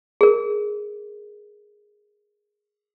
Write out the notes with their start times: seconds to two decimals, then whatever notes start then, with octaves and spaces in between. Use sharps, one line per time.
0.21 G#4 A#4